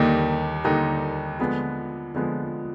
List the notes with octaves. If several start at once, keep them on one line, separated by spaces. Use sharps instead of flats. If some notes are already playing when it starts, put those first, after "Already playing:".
Already playing: D#2 D3 G3 A#3 D#4
D#2 D3 G3 A#3 D#4
D3 F3 G#3 B3
D3 F3 G#3 B3